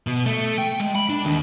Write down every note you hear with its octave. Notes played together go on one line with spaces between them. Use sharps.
B2
A3
G5
G#3
B5
D4
D#2